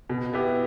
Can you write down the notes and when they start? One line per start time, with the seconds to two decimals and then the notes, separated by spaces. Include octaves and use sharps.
0.10 B2
0.33 B3 E4 G4